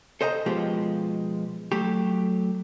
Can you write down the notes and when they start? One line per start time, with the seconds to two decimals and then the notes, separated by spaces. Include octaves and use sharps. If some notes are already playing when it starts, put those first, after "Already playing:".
0.21 A4 C5 D#5 F#5 A#5
0.46 B2 F3 G#3 F4 G4
1.72 F#3 A3 G4